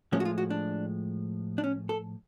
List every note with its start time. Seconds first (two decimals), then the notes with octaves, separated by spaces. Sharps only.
0.12 A2 F3 G#3 C#4
0.20 F#4
0.25 F4
0.38 F#4
0.50 D4
1.58 D4
1.64 C#4
1.89 A4